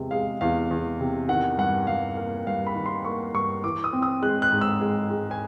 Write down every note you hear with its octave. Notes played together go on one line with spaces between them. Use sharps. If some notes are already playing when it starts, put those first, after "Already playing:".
Already playing: E2 C3 G#3
G#3 F5
E2 F5
E2
C3
D#3 F#5
G2 F#5
G2 F5
A#3 F5
G2 F5
B5
D#3
C6
A#3 C#6
G2 C#6
E3 D6
D#6
C4
D#6
G#3 F#6
F#6
G#2
E6
G#3
G#3
G#5